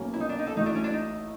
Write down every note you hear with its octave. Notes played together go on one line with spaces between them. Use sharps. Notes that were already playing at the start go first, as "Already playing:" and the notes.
Already playing: B1 B2 F#3 A#3 C#4
E4
D#4
D4
D#4
A4
A1 A2 F#3 A3 D#4
D4
C#4
D4
D#4